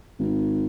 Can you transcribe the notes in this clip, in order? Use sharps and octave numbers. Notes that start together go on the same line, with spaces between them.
G#1